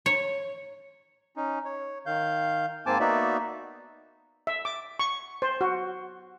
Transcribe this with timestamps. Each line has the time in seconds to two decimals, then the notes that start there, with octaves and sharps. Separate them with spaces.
0.06 C#5
1.37 C#4 D#4
1.65 C#5
2.06 D#3 F5 G6
2.86 G#2 A#3 C4 G#5 A5 D6
3.00 A#3 B3 D#4 F#4 D5 E5
4.47 E5
4.65 D6
4.99 C#6
5.42 C5
5.61 F#4